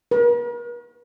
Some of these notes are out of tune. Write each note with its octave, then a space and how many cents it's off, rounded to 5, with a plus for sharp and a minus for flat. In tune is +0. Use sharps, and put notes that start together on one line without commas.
A#4 +45